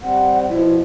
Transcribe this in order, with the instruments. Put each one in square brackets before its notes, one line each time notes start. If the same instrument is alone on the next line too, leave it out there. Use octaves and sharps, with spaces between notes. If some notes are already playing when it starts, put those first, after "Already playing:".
[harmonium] G3 C4 [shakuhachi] F#5
[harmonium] B2 F3 [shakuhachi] E4